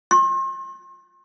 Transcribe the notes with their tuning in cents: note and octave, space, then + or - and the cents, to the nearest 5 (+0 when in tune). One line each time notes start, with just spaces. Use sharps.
C6 +40